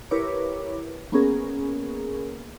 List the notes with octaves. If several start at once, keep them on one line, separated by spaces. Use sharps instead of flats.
E4 G4 A#4 B4 C#5 D6
A#3 B3 C#4 G#4 A#4